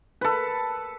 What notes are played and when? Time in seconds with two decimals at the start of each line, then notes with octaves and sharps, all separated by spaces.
0.21 A4 B4